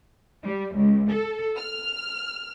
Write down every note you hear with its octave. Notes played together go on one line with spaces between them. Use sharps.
G3
C#2
A4
F6